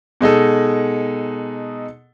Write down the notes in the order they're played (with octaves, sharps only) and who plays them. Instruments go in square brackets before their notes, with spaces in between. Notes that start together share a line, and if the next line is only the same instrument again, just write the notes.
[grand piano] B2 G#3 D#4 A4